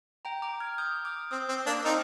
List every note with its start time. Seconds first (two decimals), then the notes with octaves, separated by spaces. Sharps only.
0.25 G5 A#5
0.42 A#5 D6
0.60 F6 G#6
0.78 D#6 G6
1.05 D6 F6
1.31 C4 D#6 G6
1.49 C4
1.66 A#3 D4
1.85 C4 D#4 D6 F6